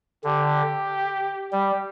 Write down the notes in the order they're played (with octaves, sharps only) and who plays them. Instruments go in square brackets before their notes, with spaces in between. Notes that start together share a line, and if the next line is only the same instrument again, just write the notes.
[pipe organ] D3 [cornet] G4
[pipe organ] G3 [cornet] G4